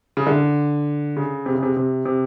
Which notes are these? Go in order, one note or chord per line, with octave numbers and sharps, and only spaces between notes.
C#3
D3
C#3
C3
C#3
C3
C3
C3